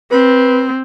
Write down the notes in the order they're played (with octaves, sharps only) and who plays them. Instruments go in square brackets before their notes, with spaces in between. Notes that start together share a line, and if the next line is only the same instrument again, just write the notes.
[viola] C4 [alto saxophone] B4